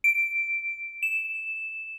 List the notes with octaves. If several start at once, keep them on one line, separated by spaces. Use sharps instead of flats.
D7
E7